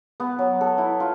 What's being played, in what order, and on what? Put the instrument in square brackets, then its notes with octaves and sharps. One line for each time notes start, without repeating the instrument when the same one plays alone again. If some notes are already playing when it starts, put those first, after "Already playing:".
[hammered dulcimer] B3
F#3
A4
E4
F4